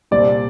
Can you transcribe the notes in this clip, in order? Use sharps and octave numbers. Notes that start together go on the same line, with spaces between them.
C2 A#2 G3 C4 D5